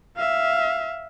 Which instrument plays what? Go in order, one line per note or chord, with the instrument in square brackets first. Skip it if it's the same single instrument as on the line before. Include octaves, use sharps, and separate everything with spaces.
[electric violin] E5 F5